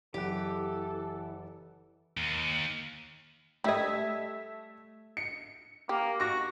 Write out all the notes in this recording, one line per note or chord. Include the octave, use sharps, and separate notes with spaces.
F#1 E3 G4 A4 F#5
D#2
G3 A3 D#5 E5 G#6
C#7
A#3 G4
F#4 C#6 A#6